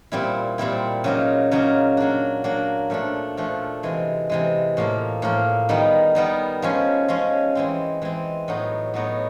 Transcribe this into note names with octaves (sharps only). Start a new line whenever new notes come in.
A#2 G3 C4 E4
A#2 G3 C4 E4
C#3 F#3 A#3 D#4
C#3 F#3 A#3 D#4
F#3 A#3 D4
F#3 A#3 D4
A#2 F3 A3 D4
A#2 F3 A3 D4
C3 E3 G#3
C3 E3 G#3
A2 F3 A#3
A2 F3 A#3
D#3 G3 B3 D#4
D#3 G3 B3 D#4
F3 G#3 C#4
F3 G#3 C#4
E3 G#3 C4
E3 G#3 C4
A2 F#3 B3 D#4
A2 F#3 B3 D#4